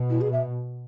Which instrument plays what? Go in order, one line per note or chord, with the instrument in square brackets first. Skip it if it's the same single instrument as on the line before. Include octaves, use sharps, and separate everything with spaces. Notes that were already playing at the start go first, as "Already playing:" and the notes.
Already playing: [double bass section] B2
[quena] E4
G#4
E5